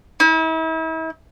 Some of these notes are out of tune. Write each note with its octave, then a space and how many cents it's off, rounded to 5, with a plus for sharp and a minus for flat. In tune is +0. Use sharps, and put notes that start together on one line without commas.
E4 -40